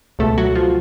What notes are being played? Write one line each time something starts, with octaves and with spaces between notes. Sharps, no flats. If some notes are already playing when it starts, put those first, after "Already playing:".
C#2 B2 A3 A4
F#3 F#4
F3 F4